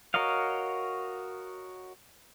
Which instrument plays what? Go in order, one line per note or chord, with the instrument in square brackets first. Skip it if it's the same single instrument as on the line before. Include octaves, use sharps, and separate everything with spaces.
[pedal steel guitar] F#4 A#4 C#5 D#5 F5